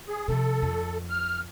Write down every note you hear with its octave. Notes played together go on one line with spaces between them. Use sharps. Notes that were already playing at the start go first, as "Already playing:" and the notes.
G#4
C3 F3 A4
F2
F6